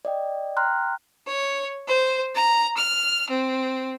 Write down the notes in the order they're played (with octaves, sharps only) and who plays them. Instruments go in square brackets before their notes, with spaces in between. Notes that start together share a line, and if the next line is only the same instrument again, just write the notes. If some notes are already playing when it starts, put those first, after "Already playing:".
[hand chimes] D5 D#5 G5
G5 A#5 C6 F6 F#6
[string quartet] C#5
C5
A#5
F6
C4